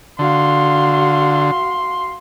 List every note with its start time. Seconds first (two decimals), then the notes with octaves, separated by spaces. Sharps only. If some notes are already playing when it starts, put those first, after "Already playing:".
0.19 D3 F#4 F5 C6